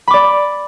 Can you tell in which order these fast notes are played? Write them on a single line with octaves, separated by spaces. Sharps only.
B5 D6 D5